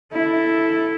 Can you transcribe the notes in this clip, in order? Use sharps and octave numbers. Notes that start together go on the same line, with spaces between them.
E4 A4